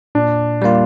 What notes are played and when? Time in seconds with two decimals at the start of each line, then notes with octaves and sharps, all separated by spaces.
0.15 A#2 D4
0.62 G3 A#3 F4